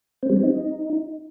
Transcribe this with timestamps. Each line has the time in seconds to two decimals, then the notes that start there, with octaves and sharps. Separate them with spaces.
0.23 C4
0.30 G3
0.37 C4
0.44 D#4